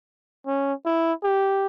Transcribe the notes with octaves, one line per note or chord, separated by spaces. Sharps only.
C#4
E4
G4